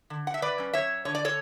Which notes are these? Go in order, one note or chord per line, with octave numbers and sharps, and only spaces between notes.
D3
F#5
E5
B4 D5
F#3 C#4
C#5 E5
D3 C#5
D5
A4 C#5